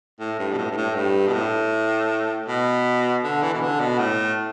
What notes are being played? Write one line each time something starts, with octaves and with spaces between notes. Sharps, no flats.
A2
G2
B2
A2
G2
A2
G2
B2
A2
B2
D3
E3
B2
D3
B2
A2